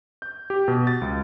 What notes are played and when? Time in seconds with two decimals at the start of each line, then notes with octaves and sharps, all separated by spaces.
0.22 G6
0.50 G4
0.68 B2
0.87 A6
1.02 C#2